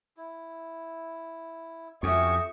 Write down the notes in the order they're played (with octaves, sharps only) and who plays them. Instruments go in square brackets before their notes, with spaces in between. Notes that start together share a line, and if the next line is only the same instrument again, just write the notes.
[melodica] E4
[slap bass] F2 [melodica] C#4 F#4 G4 [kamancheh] E5 C#6 [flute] D#6